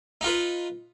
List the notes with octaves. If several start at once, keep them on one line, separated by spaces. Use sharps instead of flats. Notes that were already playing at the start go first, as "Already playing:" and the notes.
D#4 F4 B4